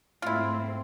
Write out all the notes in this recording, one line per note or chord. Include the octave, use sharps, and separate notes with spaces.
G#2 A3 C4 E4 F4